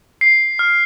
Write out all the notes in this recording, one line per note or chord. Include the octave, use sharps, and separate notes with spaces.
C7
F6